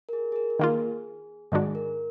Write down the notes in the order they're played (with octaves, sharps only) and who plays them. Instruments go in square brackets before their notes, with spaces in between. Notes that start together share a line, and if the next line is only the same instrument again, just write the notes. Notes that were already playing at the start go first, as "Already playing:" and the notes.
[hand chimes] A#4
G#4
G#4
A#4
A#4
[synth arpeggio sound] D#3 A#3 F4 [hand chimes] G#4
[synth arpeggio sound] G#2 D#3 G#3 D4 F#4 [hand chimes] G#4
[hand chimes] A#4